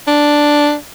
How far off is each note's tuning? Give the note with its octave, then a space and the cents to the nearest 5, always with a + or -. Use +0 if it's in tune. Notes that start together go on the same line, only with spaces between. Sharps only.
D4 +0